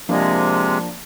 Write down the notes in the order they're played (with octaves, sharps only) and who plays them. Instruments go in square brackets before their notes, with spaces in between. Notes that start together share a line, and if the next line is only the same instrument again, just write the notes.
[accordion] C3 G#3 [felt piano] F3 A#3 D4